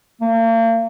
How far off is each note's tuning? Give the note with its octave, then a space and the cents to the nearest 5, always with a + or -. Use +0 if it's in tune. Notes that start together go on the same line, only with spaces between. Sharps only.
A#3 -40